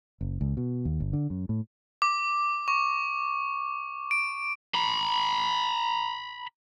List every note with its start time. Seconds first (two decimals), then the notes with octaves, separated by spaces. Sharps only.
0.21 F#1
0.41 C#2
0.57 B2
0.85 D#2
1.00 G1
1.13 D3
1.30 F#2
1.49 A2
2.02 D6
2.68 C#6
4.11 D7
4.75 A#5 B5